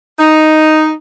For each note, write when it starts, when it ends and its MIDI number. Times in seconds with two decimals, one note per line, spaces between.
0.19 0.92 63